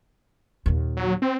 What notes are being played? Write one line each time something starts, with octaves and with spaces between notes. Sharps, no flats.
D#2 A#2
F#3
C4